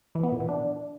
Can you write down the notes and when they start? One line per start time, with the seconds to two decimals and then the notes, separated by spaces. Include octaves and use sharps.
0.15 E3
0.23 B3
0.32 A#2
0.40 E3
0.49 D4